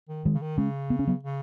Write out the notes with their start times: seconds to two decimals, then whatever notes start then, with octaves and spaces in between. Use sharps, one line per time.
0.09 D#3
0.25 D#3 G#3
0.35 C#3
0.42 D#3
0.58 C#3 G#3 C#4
0.90 B3
0.99 C#4
1.07 F#3 B3
1.24 C#3